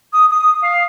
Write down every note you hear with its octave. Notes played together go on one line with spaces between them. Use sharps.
D#6
D#6
F5